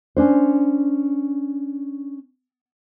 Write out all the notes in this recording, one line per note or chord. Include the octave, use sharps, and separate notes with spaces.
C#4 D4 C5